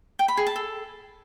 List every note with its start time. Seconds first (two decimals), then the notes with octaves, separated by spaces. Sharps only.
0.19 G5
0.28 B5
0.37 G#4
0.47 A5
0.56 A4